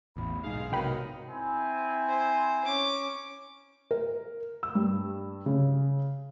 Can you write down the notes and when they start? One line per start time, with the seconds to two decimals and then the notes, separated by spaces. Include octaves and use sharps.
0.17 A1 E2 B5
0.44 B1 G#2 D#4 G#4 F5
0.72 C3 F#3 B3 D#4 A#4 G5 B5
1.30 C4 E4 G#5
2.09 C5
2.64 C#4 D6
3.91 A#4
4.63 E6
4.75 G2
5.46 C#3